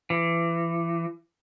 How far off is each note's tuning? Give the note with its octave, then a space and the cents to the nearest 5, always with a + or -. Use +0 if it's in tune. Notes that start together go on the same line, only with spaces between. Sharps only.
E3 +30